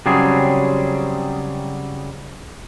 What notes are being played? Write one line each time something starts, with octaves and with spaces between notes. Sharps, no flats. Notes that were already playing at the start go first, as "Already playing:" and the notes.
C#3 F#3 G3 C4 G#4